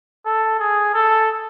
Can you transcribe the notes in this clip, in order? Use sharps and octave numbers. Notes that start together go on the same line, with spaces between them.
A4
G#4
A4